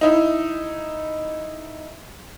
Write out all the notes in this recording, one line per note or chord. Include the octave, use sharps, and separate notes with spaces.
D#4 E4